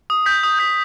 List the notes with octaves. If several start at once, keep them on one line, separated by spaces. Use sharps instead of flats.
D#6
G6 B6
D#6
G6 B6